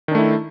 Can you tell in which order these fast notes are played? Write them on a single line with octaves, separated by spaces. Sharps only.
D#3 D4 A3 E4